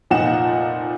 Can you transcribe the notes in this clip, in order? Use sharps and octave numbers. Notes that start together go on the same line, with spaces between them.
F1 A#2 F3 D#4 F#5 E7